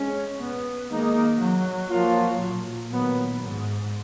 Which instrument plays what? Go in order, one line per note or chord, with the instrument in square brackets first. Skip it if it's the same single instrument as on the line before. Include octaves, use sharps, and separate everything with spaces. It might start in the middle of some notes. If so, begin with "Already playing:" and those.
Already playing: [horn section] G#3 C#4
[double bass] B3
[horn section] D#3 G#3 D#4 [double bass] A#3
[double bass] F#3
[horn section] F3 A#3 F4
[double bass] A#2
[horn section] D#3 F#3 B3
[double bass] G#2